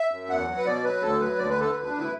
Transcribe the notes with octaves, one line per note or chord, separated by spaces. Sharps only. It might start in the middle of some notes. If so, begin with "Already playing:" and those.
Already playing: E5
F#2
E2 F#5
F#3
B4
B2 D5
F#3 B4
D2 A4
F#3 B4
D2 D5
B4
D3 A4
D2 B4
D4
D2
E4